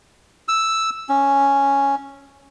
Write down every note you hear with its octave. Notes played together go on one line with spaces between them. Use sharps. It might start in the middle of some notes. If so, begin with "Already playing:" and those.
E6
C#4